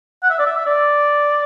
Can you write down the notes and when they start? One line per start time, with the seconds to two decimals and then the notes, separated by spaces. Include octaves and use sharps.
0.23 F#5
0.30 E5
0.39 D5
0.47 E5
0.57 E5
0.66 D5